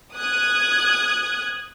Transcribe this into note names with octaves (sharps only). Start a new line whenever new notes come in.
D#6 F#6 G#6